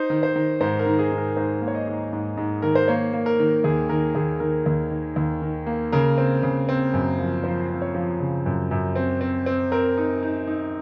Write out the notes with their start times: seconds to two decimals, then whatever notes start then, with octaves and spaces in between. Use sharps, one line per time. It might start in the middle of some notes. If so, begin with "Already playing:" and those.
Already playing: D#4 C5
0.10 D#3
0.23 C5
0.36 D#3
0.60 G#2 C5
0.79 A#4
0.86 D#3
0.99 G#4
1.12 G#2
1.18 A#4
1.36 G#2 C5
1.61 A#3
1.68 C#5
1.75 D#5
1.87 G#2
2.12 G#2
2.37 G#2
2.62 D#3 A#4
2.75 C5
2.88 A#3 C#5
3.13 A#3
3.26 A#4
3.39 D#3
3.64 D#2 G#4
3.89 D#3 A#4
4.15 D#2 G#4
4.40 D#3 A#4
4.66 D#2
4.91 D#3
5.16 D#2
5.42 D#3
5.66 A#3
5.92 C#3 A#4
6.18 C4
6.43 C#3
6.69 C4
6.93 F#2
7.19 F3
7.44 F3 C5
7.70 C4
7.82 C#5
7.95 F3
8.20 C#3
8.46 F#2
8.71 F#2
8.96 C4
9.21 C4
9.46 C4
9.72 C4 A#4
9.98 D#4
10.23 D#4
10.47 D#4